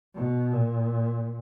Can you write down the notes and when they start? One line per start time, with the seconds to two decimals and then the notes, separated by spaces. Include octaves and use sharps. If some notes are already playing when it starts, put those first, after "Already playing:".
0.15 B2
0.53 A#2